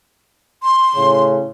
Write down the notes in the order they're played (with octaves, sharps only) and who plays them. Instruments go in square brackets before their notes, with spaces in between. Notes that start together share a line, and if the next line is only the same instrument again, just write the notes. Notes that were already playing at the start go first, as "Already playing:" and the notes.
[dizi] C6
[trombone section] A2 C#3 C#4